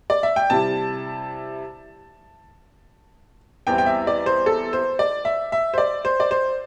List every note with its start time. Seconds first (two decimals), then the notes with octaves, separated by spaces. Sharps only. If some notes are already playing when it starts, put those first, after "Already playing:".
0.10 D5
0.23 E5
0.36 G5
0.50 C3 G3 E4 A5
3.67 E2 E3 G3 C4 E4 G5
3.78 G5
3.86 E5
4.07 D5
4.26 C5
4.46 A4
4.73 C5
4.99 D5
5.25 E5
5.52 E5
5.74 C5
5.78 D5
6.05 C5
6.20 D5
6.31 C5